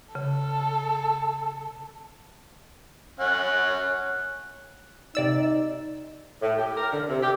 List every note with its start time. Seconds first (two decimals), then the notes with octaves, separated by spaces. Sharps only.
0.15 C#3 A4
3.20 C#4 F#5
5.15 C3 D#4 D5 E6
6.42 A2
6.58 G4
6.77 A#4
6.93 D3
7.09 C3
7.23 G4